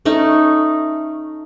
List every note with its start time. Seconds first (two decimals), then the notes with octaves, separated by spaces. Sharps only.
0.05 A3 C#4 D#4